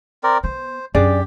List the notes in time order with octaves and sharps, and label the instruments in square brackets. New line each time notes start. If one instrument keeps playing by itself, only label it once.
[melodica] C4 A#4 D5
[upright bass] B3 [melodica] C5
[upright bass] F#2 [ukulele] D4 G#4 D5 [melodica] G4